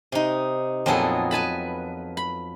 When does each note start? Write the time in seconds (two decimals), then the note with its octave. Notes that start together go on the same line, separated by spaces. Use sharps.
0.12 C3 D#4
0.86 F2 A#2 F#3 B3 G#4 A4
1.31 B4 G#5 A5 B5
2.17 B5